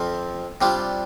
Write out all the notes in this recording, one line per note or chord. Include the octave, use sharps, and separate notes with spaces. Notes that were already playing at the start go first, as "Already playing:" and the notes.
Already playing: F2 F3 C4 F4
C3 G3 D4 F4